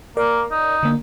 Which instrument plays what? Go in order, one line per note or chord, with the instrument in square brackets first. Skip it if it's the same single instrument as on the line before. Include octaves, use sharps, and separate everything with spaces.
[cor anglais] A#3 [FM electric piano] A#4 D5
[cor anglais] D#4
[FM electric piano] D3 A#3